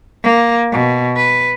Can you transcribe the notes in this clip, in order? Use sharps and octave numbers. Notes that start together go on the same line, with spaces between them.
A#3
B2
B4